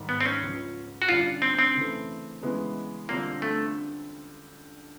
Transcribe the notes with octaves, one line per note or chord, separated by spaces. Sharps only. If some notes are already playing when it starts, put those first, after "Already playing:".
Already playing: G#2 D#3 G3
B3
C4
C#4
C#2 C#3 F3
F#4
F#2 D3 G3 F4
C4
C4
C#3 E3 A3
C#3 E3 G#3 B3
D3 G3 A#3 C4 F4
A3